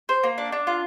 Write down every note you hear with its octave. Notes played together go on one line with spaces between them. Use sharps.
C5
A#3
D4
D4
F4